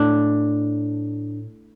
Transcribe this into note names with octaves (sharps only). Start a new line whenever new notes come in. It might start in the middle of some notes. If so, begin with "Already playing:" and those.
Already playing: A2 D4